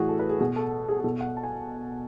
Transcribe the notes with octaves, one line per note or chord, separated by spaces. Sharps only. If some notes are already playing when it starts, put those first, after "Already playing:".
Already playing: A2 E3 F#4 G#4
A4
B4
G#4
B2 G#4
A4
G#4
G#4
B2 A4
F#5
A5
G#5